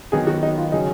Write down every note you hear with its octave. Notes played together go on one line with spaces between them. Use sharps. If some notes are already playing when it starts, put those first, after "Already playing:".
D#3 F#3 B3 G#4
F#4
D#4
F4
C#3 F#3 C#4 D#4 G#4